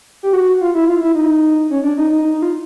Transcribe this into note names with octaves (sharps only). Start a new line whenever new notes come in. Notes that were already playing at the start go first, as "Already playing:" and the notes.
G4
F#4
F4
E4
F4
E4
D#4
C#4
D4
D#4
D#4
D#4
F4